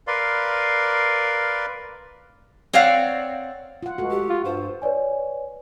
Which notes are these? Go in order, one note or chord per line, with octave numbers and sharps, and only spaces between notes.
A#4 B4 D5 F5 C6
C4 C#5 D5 F5 F#5
F4 F#5
C#2 F#4 A4
G4
F4
G2 C5
B4 C#5 D5 G#5